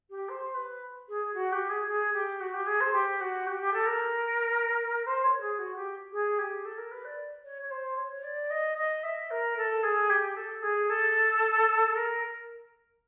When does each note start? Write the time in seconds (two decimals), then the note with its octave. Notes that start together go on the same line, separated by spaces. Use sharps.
0.10 G4
0.29 C5
0.54 B4
1.08 G#4
1.33 F#4
1.52 G4
1.69 G#4
1.87 G#4
2.13 G4
2.40 F#4
2.53 G4
2.66 G#4
2.80 C5
2.93 G4
3.20 F#4
3.46 G4
3.60 G4
3.73 A4
3.86 A#4
5.06 C5
5.24 C#5
5.41 G#4
5.58 F#4
5.76 G4
6.12 G#4
6.38 G4
6.64 A4
6.77 A#4
6.91 B4
7.04 D5
7.44 C#5
7.62 C#5
7.70 C5
7.97 C#5
8.12 C#5
8.23 D5
8.50 D#5
8.77 D#5
9.03 E5
9.30 A#4
9.57 A4
9.83 G#4
10.09 G4
10.36 A4
10.62 G#4
10.89 A4
11.94 A#4